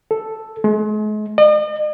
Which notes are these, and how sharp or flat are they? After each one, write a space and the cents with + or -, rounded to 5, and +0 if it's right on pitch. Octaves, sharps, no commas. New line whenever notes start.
A4 +0
G#3 +40
D#5 -45